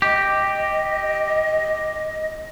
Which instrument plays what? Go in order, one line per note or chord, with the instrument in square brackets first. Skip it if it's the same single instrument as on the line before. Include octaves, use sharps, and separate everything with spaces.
[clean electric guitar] G4 [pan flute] D#5